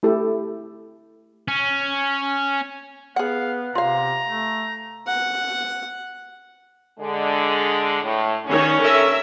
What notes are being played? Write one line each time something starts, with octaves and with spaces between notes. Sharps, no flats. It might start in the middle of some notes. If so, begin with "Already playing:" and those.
A3 E4 G4 A4
C#4
B3 G#4 F5 F#5
C3 F4 F5 A#5
A3
F#5
D3 G#3
A2
G2 D#3 C#4 C#5
A4 A#4 E5